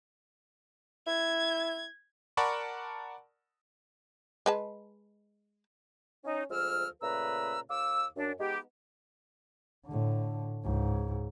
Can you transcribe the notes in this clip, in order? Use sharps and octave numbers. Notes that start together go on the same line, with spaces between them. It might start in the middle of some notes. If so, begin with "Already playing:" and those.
E4 G#6
A#4 D5 F#5 A5 B5 C#6
G#3 B4 A5
C#4 D#4
D2 F3 G#3 E6 F6
A#2 C#3 A3 B4 A#5 E6
D#2 F5 D6 E6
F#2 D4
G#3 B3 D#4 G4
A2 D3
C#2 G#2